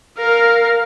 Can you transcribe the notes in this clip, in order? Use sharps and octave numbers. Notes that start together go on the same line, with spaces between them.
A#4 F5